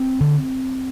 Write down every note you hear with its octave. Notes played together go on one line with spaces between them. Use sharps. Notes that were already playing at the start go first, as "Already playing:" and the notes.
Already playing: C4
D3